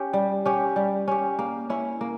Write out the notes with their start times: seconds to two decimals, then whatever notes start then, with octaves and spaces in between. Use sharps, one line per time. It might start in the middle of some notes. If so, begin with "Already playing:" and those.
Already playing: C#4 G4
0.13 G3
0.46 C#4 G4
0.76 G3
1.08 C#4 G4
1.39 A#3
1.70 C#4 E4
2.01 A#3